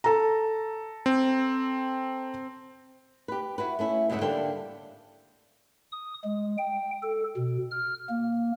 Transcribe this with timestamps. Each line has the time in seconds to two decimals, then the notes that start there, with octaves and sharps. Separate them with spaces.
0.04 A4 A#5
1.06 C4
3.28 G4 B4
3.58 E4 F#4 B4
3.79 A3 C#4 E4
4.10 F2 G#2 C#3 G4 E5 F#5
4.21 D3 G3 A#3 D4 A4 G5
5.92 D#6
6.24 G#3
6.58 G5
7.03 A4
7.37 B2
7.71 F6
8.09 A#3